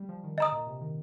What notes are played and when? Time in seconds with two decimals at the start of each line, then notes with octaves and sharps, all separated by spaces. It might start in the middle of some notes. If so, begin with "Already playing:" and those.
Already playing: G3
0.09 F3
0.24 D#3
0.38 D3 D#5 A#5 D#6
0.52 A#2
0.67 C3
0.81 D#3